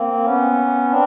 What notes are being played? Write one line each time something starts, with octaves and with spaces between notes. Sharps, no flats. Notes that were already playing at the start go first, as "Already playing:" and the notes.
Already playing: A#3 C4
B3 C#4
C4 D4